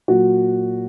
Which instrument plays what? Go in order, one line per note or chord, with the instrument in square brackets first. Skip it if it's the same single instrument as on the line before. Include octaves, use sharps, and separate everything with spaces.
[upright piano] A#2 F#3 F#4